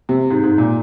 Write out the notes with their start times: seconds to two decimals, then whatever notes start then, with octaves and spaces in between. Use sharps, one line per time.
0.09 C3
0.31 G#2
0.44 G#2
0.58 A#2